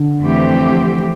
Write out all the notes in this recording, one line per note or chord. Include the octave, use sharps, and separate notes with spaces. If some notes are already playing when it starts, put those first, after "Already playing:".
Already playing: D3
F2 E3 A3 C4 G4